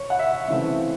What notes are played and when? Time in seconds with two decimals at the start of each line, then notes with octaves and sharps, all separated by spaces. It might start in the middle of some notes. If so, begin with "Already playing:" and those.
Already playing: C#5
0.10 F#5
0.19 E5
0.48 C#3 E3 A3 C4 E5